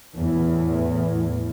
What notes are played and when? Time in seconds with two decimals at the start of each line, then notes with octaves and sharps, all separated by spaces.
0.16 E2 A2